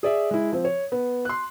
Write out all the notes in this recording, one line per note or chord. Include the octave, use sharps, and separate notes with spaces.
G#4 D5 E5
G#3 E4
F3 C4
C#5
B3
C6 F#6